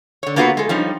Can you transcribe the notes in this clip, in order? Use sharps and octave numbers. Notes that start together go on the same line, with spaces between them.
D3 C#5
A#3 B3 F4 F#4 A4 B4
G#3 A4
F3 G3 C#4 D#4